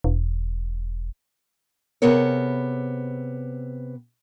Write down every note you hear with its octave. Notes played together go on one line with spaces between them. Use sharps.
E1
C3 B3 G#4 A#4 C#5